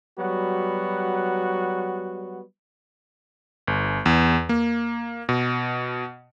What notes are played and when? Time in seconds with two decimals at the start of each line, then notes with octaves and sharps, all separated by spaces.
0.18 F#3 G3 B3 F#4
3.67 G1
4.06 E2
4.49 A#3
5.29 B2